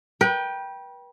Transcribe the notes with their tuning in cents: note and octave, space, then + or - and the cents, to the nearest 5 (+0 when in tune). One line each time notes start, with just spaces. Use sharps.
B4 -35 G5 +0